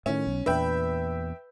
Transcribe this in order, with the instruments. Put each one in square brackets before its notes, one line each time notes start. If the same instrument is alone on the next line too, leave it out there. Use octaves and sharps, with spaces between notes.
[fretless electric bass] A2 D#3 [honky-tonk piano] C#4
[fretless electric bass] B1
[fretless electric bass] E2 A#2 D4 [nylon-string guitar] B4 [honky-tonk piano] E5 G5